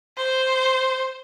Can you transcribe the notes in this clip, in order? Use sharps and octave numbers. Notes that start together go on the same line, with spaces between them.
C5